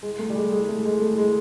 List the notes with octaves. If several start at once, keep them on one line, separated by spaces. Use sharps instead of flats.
G#3
A3
G3
G#3
G#3
A3
G#3
A3
G#3